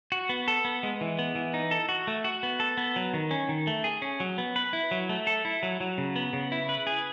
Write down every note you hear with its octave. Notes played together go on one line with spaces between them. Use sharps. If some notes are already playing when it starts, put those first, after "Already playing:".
F#4
B3
A4
B3
G#3
E3
B3
E3
D#4
A4
F#4
A3
F#4
B3
A4
B3
F#3
D#3
C#4
D#3
A3
G#4
C#4
F#3
B3
B4
E4
F#3
A3
A4
E4
F#3
F#3
C#3
B3
C#3
E4
B4
G#4